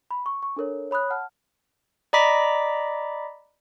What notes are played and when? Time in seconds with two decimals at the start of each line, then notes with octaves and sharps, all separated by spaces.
0.11 B5
0.26 C#6
0.43 C#6
0.56 D4 A4 A#4 C#5
0.91 C#5 B5 D#6 F#6
1.10 F#5 A5 F6
2.13 D5 D#5 A#5 B5 D6 B6